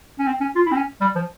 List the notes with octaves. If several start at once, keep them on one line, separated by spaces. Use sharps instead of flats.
C#4
C4
C#4
F4
E4
C4
C#4
G3
F3